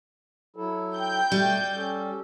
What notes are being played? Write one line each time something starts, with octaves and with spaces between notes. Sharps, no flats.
F#3 E4 A4
G5 G6
B2 G3 A3
C#4 A4